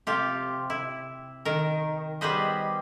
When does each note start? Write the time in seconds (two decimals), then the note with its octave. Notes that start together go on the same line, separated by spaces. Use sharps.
0.07 C3 F3 F4 G4
0.70 E4
1.45 D#3 A#4
2.21 G3 B3 G#4 B4 C5 D#5